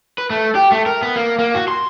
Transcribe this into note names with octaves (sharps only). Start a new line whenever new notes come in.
B4
A3
G4
A3
A#4
B3
A#3
A#3
F#4
C6